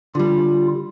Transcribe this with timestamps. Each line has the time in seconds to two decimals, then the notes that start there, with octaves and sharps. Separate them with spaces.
0.15 D3 G3 F4